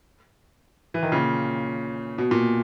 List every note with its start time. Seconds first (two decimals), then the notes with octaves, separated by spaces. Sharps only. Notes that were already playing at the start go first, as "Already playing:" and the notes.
0.94 E3
1.03 D#3
1.12 A#2 C#3
2.18 B2
2.31 A#2